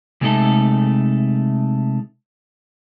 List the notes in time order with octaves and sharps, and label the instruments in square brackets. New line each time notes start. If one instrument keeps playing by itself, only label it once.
[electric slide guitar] C3 G#3 A3 D#4 A4